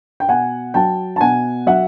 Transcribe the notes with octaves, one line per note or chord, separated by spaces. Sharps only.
G5
B2 F#5 G#5
F#3 G5 A5
A5
B2 F#5 G#5
F#3 E5 F#5